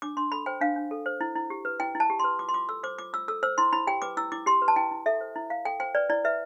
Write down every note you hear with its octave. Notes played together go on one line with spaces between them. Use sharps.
D4 D6
D4 C6
A4 B5
C5 G5
D4 F5
D4
A4
C5
E4
E4
G4
B4
E4 G5
E4
A5
G4
B4 C6
F4 D6
C6
F4 D6
A4 E6
C5 D6
F4 D6
F4 E6
A4 E6
C5 E6
E4 C6
E4 B5
G4 G5
B4 D6
E4 E6
E4 D6
G4 C6
B4
A5
E4 G5
E4
A4 E5
C5
E4
E4 F5
A4 G5
C5 G5
B4 D5
E4 D5
B4 E5